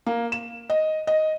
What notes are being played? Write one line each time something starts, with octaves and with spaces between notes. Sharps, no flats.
A#3
E7
D#5
D#5